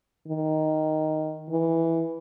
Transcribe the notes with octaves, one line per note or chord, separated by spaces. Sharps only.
D#3
E3